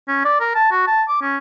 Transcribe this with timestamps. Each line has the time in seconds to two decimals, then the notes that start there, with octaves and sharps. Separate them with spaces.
0.08 C#4
0.25 D5
0.40 A#4
0.55 A5
0.71 F#4
0.87 A5
1.08 D6
1.21 C#4